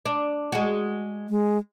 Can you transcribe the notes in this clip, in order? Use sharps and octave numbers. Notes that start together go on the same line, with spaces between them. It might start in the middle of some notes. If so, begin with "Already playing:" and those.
D4
G#3 F#4
G#3